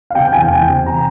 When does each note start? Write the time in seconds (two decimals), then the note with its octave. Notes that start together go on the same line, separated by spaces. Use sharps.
0.10 F5
0.15 C3 G5
0.28 G5
0.33 E2 G#5
0.51 E2 G5
0.69 C3
0.86 A#5